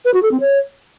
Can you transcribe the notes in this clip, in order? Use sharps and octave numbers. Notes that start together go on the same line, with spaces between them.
B4
F#4
A4
C4
C#5